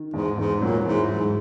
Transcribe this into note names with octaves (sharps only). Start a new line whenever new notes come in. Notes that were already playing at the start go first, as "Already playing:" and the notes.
Already playing: D#3
E2 G#2
E2 G#2
A#2 F#3
G#2 E3
G#2 G#3